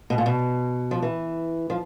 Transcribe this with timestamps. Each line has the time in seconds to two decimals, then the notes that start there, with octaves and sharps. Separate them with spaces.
0.10 B2
0.18 A#2
0.26 B2
0.91 F3
1.02 E3
1.70 F3